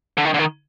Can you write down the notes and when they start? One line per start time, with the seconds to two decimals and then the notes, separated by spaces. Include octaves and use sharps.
0.18 D3
0.25 D#3
0.34 D3
0.39 D#3